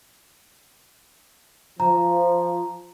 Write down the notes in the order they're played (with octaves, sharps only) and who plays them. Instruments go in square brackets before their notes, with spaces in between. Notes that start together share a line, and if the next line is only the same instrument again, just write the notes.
[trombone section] F3 [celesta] A#5